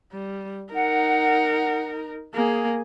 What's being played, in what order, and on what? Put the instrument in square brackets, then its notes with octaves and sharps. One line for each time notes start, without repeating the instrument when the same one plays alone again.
[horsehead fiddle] G3
[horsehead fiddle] D#4 A#4 [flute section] F#5
[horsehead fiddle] A#3 [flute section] G#4